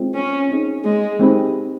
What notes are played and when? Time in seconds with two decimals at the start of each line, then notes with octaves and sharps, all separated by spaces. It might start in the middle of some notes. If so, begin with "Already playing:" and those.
Already playing: G#3 C4 F4
0.15 C#4
0.49 C4 D#4 G#4
0.84 G#3
1.19 G#3 C4 D#4 G4 B4